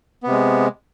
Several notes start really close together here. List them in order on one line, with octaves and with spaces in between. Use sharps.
B3 C3 G#3